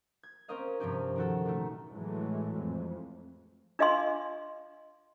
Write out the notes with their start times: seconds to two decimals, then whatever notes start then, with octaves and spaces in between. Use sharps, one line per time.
0.23 G#6
0.48 C4 C#4 A#4 D#5 F5
0.80 G2 C3 F3 C4 C#4 G4
1.16 D#3 F#4 A4
1.45 A#2 D#3 A3
1.91 A2 E3 F#3 G#3 A3
2.56 F2
3.79 D4 F4 D#5 F5 G#5 C6